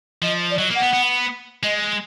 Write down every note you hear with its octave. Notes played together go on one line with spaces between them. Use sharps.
F3 D#5
D5
F#3 D#5
A#3
F#5
B3
B3
G#3 D#5